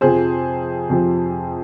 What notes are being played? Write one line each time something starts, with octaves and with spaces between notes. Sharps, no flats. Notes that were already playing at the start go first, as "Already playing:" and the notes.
F2 C3 F3 G#4 C5
F2 C3 F3